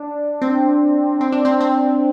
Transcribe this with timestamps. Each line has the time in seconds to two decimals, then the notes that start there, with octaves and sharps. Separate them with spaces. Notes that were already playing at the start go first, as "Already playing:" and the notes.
Already playing: D4
0.42 C4
1.21 C4
1.32 D4
1.45 C4
1.61 C4